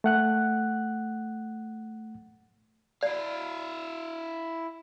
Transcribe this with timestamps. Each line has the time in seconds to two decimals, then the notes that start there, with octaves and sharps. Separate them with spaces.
0.04 A3 F#5 F#6
3.03 E4 D5 F5